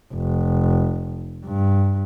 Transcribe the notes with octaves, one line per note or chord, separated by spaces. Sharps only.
F1
G2